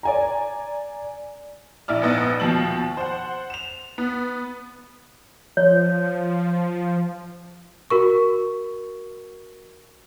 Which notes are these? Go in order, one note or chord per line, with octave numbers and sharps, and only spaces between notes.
D5 G#5 A#5
A#1 E4 D5 F6
A#1 G#2 B3 D#5 E6 A6
D#2 B2 F3 A5 A6 F#7
C5 F#5
E7 F7
B3
F3 C#5
F#4 A#4 C#6